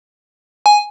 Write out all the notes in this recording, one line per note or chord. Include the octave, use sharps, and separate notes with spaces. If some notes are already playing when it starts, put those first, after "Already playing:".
G#5